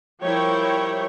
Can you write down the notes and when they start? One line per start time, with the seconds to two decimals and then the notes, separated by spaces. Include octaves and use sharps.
0.23 F3 G3 E4 A#4 C#5 G5